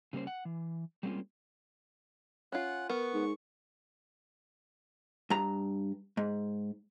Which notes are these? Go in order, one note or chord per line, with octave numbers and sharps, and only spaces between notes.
C#3 G3 A#3 C#4 C5
F#5
E3
G3 G#3 A#3 C4 C#4 F4
C#4 F4 F#5
B3 A#4 C#6
G#2
G2 A#5
G#2